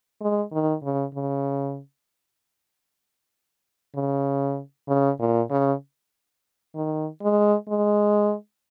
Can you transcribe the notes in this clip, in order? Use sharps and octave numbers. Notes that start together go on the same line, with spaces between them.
G#3
D#3
C#3
C#3
C#3
C#3
A#2
C#3
D#3
G#3
G#3